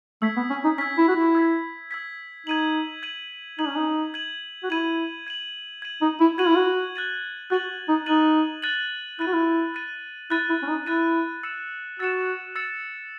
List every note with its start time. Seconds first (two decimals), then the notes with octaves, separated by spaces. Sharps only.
0.22 A3 E6 G#6 B6
0.37 B3
0.50 C#4
0.64 D#4
0.78 C#4 E6 G#6 B6
0.98 E4
1.08 F#4
1.16 E4
1.35 E6 G#6 B6
1.91 E6 G#6 B6
2.47 D#4 G#6 D#7 F#7
3.03 G#6 D#7 F#7
3.59 D#4 G#6 D#7 F#7
3.67 C#4
3.75 D#4
4.14 G#6 D#7 F#7
4.63 F#4
4.70 E4 G#6 D#7 F#7
5.27 G#6 D#7 F#7
5.82 G#6 D#7 F#7
6.01 D#4
6.20 E4
6.38 F#4 G#6 D#7 F#7
6.47 E4
6.56 F#4
6.95 F#6 A6 D#7 F#7
7.50 F#4 F#6 A6 D#7 F#7
7.89 D#4
8.06 D#4 F#6 A6 D#7 F#7
8.62 F#6 A6 D#7 F#7
9.19 E4 F#6 A6 D#7
9.27 F#4
9.33 E4
9.74 F#6 A6 D#7
10.30 E4 F#6 A6 D#7
10.49 E4
10.63 C#4
10.68 D#4
10.86 E4 F#6 A6 D#7
11.43 E6 A6 C#7 E7
11.99 F#4 E6 A6 C#7 E7
12.56 E6 A6 C#7 E7